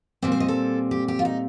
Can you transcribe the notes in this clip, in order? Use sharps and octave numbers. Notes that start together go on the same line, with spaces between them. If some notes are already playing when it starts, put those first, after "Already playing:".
A#2 G3 C4 D5
C5
D#5
A4
G4
G4
F4
D#4